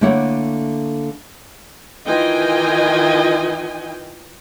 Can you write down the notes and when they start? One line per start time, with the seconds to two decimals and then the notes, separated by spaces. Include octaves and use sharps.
0.01 D3 A3 A#3 E4 C#5 F#5
2.06 D#3 E3 F4 D#5 G5 G#5